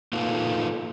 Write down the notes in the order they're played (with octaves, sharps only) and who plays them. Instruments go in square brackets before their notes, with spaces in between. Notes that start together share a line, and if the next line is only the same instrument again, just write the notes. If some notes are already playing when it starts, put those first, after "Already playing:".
[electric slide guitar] A#3 D#4 F4 A4 B4